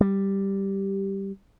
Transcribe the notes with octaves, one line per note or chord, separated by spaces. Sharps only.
G3